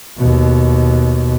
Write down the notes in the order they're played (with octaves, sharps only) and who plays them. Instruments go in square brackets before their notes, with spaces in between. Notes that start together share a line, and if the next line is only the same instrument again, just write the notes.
[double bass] D#2 B2